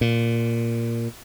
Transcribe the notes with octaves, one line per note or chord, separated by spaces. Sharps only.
A#2